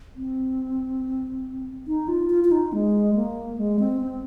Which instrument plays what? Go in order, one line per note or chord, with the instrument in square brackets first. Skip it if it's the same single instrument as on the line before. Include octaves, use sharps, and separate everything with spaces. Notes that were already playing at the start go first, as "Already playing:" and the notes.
[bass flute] C4
D#4
F4
F4
F4
D#4
G#3
A#3
G#3
C4
C4